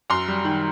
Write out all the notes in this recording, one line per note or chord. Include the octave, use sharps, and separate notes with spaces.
F#2 A#5 C6
G3
D#3